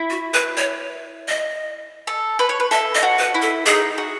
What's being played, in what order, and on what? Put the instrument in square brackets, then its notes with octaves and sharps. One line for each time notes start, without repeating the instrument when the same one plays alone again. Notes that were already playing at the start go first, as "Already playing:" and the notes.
Already playing: [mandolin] E4
[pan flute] F#4
B4
C#5
D#5
[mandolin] A4
B4
C#5
B4
[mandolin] A4 [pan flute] E5
[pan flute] D#5
[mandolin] F#4
[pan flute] B4
[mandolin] E4
[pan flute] A4
[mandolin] D#4 [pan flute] G#4
[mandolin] F#4